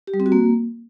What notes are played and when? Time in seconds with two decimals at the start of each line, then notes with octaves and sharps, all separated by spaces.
0.07 G4
0.14 G3
0.20 C4
0.26 F#4
0.32 A#3